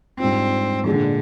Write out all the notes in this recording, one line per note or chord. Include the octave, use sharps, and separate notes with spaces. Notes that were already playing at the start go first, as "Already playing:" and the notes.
G#2 G3 C4 D4 F4
A#2 D3 G#3 D4 G#4